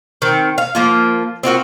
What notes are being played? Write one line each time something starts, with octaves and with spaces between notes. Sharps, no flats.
D#3 C4
F5
F3 A#3 F4
C4 F4 F#4 A#4